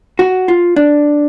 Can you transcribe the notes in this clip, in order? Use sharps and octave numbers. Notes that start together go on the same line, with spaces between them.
F#4
F4
D4